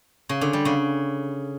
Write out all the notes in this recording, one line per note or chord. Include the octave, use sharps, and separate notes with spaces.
C#3
D3
G3
C#3